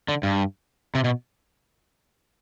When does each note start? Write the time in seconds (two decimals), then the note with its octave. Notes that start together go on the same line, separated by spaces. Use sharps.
0.08 D3
0.23 G2
0.95 C3
1.04 B2